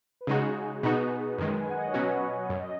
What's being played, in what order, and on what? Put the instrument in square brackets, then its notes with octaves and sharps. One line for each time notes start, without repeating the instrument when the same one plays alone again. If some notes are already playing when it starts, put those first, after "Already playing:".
[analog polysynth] B4
[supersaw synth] C#3 G#3 D#4 F#4 [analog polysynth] G#4
[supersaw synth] B2 B3 D#4 F#4 [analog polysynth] B4
[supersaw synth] F#2 D#3 G#3
[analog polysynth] G#5
F#5
D#5
C#5
[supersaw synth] B2 F#3 C#4 F#4 [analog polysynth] B4
[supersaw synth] F#2 [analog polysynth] C#5
[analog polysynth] D#5